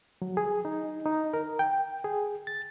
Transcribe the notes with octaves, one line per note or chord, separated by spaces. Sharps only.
F#3
G#4
D#4
D#4
A#4
G5
G#4
A6